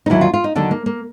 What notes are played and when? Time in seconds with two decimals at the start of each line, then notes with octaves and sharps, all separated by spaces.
0.06 D#4
0.10 D#2 D3 F#3 E4
0.21 F4
0.34 F4
0.44 D#4
0.55 D#2 D3 F#3 D4
0.71 A#3
0.86 A#3